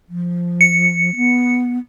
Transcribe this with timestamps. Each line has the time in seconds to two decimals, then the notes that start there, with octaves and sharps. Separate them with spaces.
0.09 F3
0.61 C#7
1.16 B3